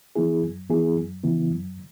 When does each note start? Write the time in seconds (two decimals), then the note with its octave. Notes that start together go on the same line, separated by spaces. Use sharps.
0.16 E3 B3 E4 G#4
0.42 F#2
0.70 E3 B3 E4 G#4
0.96 F#2
1.24 C#3 E3 B3 E4
1.50 F#2